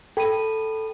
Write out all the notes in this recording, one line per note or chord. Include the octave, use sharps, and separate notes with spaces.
A4 G5 B5 D#7